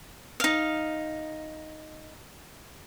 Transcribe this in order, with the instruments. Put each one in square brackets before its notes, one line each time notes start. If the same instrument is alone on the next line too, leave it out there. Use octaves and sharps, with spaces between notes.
[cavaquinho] D#4 F5